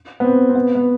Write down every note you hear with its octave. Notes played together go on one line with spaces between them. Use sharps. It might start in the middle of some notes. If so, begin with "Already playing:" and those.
B3
C4
C4
B3
B3